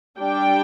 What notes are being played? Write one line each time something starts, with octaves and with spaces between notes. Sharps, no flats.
G3 D4 G5